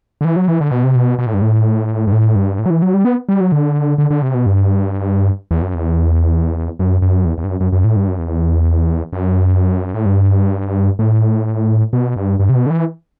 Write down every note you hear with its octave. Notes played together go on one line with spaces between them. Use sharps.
D3
E3
F#3
E3
D3
B2
C3
B2
B2
A2
G2
A2
G2
A2
G2
A2
F#3
E3
F#3
G3
B3
G3
F#3
D3
D3
D3
C3
B2
G2
E2
F#2
E2
F#2
F#2
E2
E2
G2
F#2
F#2
F#2
A2
G2
F#2
E2
F#2
A2
G2
A2
B2
G2
G2
C3
B2
D3
E3